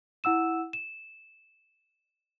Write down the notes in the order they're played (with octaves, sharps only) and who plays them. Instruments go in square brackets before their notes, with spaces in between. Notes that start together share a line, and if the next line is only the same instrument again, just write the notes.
[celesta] E4 F#5 E6 E7
E7